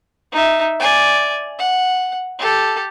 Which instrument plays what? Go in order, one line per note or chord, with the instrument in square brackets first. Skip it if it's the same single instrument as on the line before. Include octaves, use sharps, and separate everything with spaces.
[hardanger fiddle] D#4 E5
D5 G#5
F#5
G4 A4